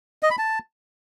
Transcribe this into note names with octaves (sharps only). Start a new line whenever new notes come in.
D#5
B5
A5